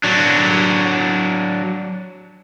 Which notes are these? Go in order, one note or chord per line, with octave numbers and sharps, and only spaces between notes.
F#3 D4